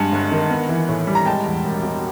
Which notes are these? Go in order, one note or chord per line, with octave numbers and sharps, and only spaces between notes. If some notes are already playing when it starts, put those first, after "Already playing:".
Already playing: G2 G#3 F#5 G#5
G1
D#3
B3
E3
A2
G3
A#5
G#3 G5 A5
E2
E1
B2